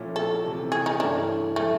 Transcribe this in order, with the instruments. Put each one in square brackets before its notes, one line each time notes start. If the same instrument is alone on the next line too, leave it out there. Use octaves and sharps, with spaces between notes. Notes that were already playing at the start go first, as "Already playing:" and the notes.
Already playing: [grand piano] A#2 F3 A3 C#4 E4
[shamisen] A4
[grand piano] C3 E3 A3
[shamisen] G#4
D#4
[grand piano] G2 E3 A3 C#4 E4 [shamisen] D4
[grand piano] A#2 F3 [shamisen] A3